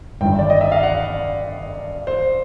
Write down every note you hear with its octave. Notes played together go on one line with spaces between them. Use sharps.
G1 G2 D#3 G5
D5
D#5
E5
F5
F#5
C5